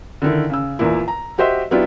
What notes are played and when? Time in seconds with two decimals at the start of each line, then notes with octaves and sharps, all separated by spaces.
0.22 D3 D#3 E4
0.50 C#3 E6
0.79 E2 A#2 A#3 E4
1.08 A#5
1.38 F#4 G4 C5 D#5 E5
1.71 F#3 B3 D4 E4 F4 G4